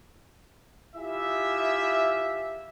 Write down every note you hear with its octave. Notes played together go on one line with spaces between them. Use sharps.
E4 F4 G4 G#4 E5